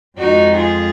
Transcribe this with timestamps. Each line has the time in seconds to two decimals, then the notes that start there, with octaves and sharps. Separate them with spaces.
0.18 F2 F3 G#3 D#4 F#4
0.55 F4 G#4